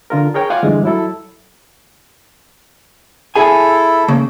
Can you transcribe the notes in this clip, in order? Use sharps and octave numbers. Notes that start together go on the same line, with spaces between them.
D3 F4 A#4
G#4 A#4 C#5 G5
F4 F5 F#5 G#5 D6
G2 D3 E3 G#3
F#3 E4 A4
E4 G#4 A4 G#5
C#3 A#3